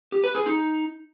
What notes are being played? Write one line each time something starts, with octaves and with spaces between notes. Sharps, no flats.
G4
B4
G#4
D#4